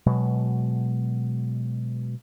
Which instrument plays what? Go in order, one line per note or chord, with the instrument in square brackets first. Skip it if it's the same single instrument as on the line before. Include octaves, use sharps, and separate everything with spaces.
[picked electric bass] B2 F#3 G#3